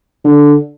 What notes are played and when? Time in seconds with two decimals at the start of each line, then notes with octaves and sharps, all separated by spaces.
0.25 D3